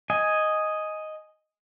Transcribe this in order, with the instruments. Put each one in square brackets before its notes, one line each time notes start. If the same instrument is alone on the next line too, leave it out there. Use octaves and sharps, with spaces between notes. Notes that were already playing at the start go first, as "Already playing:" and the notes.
[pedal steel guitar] D#5 G#5